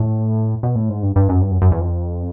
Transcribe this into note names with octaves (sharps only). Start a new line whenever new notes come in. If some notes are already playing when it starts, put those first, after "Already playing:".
Already playing: A2
B2
A2
G#2
G2
G2
F#2
G2
F#2
F#2
E2
F2